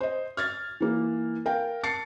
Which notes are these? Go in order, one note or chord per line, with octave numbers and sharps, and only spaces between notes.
C5 D#5
F6 G#6 A6
E3 A#3
A#4 F5 G5
A5 A6 C7 C#7